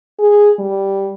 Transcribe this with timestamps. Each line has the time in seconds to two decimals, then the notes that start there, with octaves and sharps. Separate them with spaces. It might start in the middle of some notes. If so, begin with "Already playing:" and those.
0.19 G#4
0.59 G3